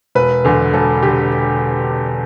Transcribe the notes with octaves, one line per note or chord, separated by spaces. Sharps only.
E1 B4
E2 D3
E1 A4
D3 G4